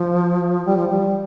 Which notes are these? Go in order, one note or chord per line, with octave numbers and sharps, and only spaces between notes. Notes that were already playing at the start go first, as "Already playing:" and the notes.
Already playing: F3
G3
F3
G3